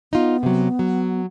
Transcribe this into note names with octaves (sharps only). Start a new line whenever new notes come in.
B3 D#4 F4
C3 F#3
F#3